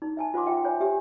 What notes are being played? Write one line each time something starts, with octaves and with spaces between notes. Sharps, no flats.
D#4
E5 G#5 A5
F4 C5 F#5 A5 C6 D6
F4 E5 G5
F4 C5 C#5 G#5
G4 E5 G#5